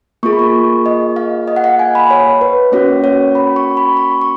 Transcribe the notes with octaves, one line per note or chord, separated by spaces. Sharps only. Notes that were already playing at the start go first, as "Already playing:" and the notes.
A#3 F4 G#4 C#6
B5
C#6
D#5
F5
D#5
F#5
F5
G#5
B5
C#5
B4
A#3 C#4 F#4 C#5
C#5
B5
C#6
B5
C#6
C#6